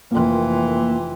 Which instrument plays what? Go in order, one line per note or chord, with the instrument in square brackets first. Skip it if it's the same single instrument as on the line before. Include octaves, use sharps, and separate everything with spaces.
[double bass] F1 E3 [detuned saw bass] A#3 [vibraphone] F4 G5 C6